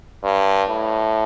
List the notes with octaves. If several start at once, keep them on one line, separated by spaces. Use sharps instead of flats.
G2
A2